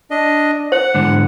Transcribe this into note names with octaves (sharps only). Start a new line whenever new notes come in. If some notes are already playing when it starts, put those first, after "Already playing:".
D4 D#5
C5 F#5
G#2 D3